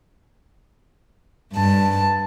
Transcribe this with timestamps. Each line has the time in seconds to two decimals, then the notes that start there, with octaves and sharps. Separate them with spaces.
1.52 G2 A5